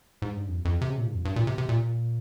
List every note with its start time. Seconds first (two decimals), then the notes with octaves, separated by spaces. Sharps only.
0.22 G#2
0.35 G2
0.48 F2
0.65 F2
0.81 C3
0.90 C#3
0.98 A#2
1.06 G#2
1.14 F2
1.25 G2
1.36 A#2
1.47 C3
1.58 C3
1.69 A#2